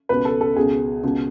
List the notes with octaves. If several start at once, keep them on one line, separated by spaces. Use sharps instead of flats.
C#2 B2 B4
A4
A4
C#2 B2 G#4
C#2 B2